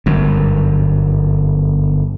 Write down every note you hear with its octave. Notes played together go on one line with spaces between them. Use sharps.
G1 F#2